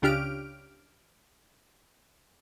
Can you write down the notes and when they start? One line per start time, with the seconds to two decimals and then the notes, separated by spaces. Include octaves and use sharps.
0.02 C#2 C#3 D4 G4 F6 D7